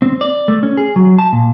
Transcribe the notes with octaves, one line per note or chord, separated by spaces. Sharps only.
C4
D5
A3
C#4
G#4
F#3
A5
A#2